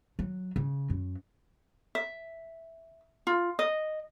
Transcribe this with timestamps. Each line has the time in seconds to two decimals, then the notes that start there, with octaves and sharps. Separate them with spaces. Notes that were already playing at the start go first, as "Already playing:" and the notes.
0.19 F#3
0.56 C#3
0.90 F#2
1.95 E5
3.27 F4
3.59 D#5